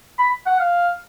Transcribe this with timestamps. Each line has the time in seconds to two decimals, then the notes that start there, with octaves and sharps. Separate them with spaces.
0.19 B5
0.46 F#5
0.59 F5